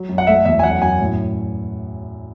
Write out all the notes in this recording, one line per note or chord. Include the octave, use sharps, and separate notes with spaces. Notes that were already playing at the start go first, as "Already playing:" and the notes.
Already playing: F#3
F#2
F#5
A3 E5
E2 E5
G#5
F#2 F#5
F#2 G#5
A2